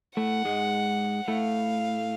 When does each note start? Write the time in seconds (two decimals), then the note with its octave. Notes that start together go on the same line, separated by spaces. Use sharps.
0.17 A2 A3 F#5
0.45 G#2 G#3
1.28 A2 A3 F5